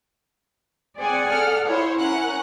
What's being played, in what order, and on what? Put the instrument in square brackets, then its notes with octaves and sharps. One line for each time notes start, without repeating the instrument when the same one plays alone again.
[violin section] C4 C5 [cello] G#4 F#5 [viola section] D5 G#5
[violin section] A4 F6 [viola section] D5
[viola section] E4 [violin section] C5 C#5
[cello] C#4 [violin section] A#4 F#5 F#6